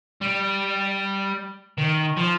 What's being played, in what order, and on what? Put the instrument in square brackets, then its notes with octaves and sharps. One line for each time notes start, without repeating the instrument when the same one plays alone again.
[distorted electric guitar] G3
D#3
F3